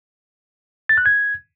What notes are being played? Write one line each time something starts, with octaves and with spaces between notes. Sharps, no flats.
A6
F#6
G#6